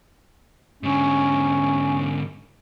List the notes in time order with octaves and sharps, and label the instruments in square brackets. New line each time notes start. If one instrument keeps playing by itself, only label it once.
[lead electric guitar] G#2 D3 [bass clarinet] C#4